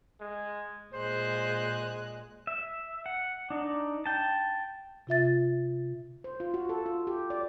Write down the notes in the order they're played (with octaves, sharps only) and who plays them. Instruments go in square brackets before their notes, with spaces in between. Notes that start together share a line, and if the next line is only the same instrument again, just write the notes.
[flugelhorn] G#3
[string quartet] A#2 G#3 F#6 [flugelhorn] C5
[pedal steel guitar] E5
F#5
D4 D#4
G5 A5
[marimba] C3 F4 E5 A6
[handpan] C5
F4
F#4
A4
F4
G4
D5